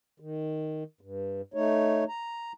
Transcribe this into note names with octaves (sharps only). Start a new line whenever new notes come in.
D#3
G2
A3 D#4 C#5
A#5